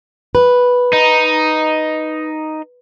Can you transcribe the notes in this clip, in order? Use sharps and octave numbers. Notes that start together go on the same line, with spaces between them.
B4
D#4